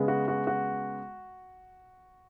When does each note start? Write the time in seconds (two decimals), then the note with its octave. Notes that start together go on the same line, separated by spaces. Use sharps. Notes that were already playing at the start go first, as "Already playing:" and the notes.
Already playing: C#3 G#3 B3
0.08 F#4
0.28 F#4
0.47 F#4